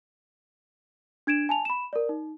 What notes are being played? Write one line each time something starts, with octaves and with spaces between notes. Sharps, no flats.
D4 G#6 D7 E7
G#5 A5 F7
B5 E7
A#4 D5
D#4